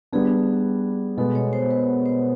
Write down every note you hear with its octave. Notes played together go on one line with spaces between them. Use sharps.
G3 B3 D4 G#4
B2 G#3 B3 A4
C#5
C5
B4
C5